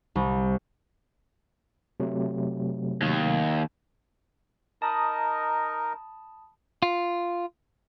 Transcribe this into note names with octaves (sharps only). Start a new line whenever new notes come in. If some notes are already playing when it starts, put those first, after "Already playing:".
C2
C3 F#3 A3
D#2
D#4 A#4 D#5 A5 B5 D#6
F4